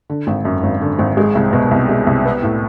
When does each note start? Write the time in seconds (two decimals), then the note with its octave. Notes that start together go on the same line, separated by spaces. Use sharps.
0.10 D3
0.27 G#1
0.45 F#2
0.63 G#1
0.81 D3
0.99 G#1
1.17 G#3
1.35 C2
1.53 B2
1.71 C2
1.89 G#3
2.07 C2
2.25 B3
2.43 A2